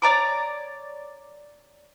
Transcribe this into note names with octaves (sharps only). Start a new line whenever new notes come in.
C#5 D5 A#5 D6